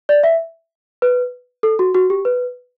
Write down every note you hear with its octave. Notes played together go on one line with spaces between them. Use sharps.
D5
E5
B4
A4
F#4
F#4
G4
B4